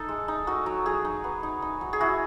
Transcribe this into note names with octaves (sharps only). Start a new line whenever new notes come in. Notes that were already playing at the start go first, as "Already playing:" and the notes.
Already playing: D#4 A4
G#3
D#4
D#4 F#4
F#3
F#3 G#4
D#4
B3
D#4
D#4
F#3
G#4
E4 F#4